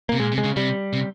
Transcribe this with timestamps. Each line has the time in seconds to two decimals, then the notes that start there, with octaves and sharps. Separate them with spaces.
0.09 C3 A#3
0.20 A#2 G#3
0.32 C3
0.38 G#3
0.44 C#3
0.56 C3 G3
0.93 C3